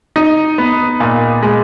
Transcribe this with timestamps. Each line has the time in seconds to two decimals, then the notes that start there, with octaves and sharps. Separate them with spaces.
0.16 D#4
0.58 B3
1.00 A#2
1.43 G#3